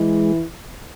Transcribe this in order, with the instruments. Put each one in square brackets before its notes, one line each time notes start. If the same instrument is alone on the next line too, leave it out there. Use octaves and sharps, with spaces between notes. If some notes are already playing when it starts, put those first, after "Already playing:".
Already playing: [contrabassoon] E3 [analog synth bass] G#3